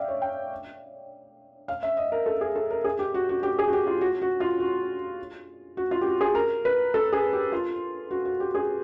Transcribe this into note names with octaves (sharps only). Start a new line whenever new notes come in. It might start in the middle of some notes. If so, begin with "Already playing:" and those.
Already playing: D5 E5 F5 G5
C#5
G5
F5
E5
D#5
A#4
A4
G#4
A4
A#4
G#4
G4
F#4
F#4
G4
G#4
F#4
G4
F4
F#4
F#4
F4
F#4
F#4
F4
G4
F#4
G#4
A#4
B4
A4
G#4
G4
F4
F#4
F#4
G4
G#4